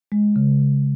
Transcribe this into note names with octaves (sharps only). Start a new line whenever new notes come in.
G#3
C#3
C#3